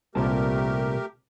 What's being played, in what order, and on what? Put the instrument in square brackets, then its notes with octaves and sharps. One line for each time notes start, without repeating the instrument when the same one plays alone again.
[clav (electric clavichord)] C2 A#2 A5 [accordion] A3 G4 A#4